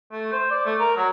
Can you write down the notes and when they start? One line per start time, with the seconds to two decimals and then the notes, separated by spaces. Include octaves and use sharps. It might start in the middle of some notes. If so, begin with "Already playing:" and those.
0.12 A3
0.32 C5
0.51 D5
0.66 A3
0.80 A#4
0.97 F#3